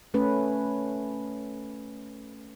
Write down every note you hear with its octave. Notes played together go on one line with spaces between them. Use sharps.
A3 C#4 B4